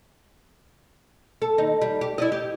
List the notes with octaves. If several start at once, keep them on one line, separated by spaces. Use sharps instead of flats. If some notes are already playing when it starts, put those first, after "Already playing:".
A4
D#2 D#4
G3
G4
E4 D5 D#5
G4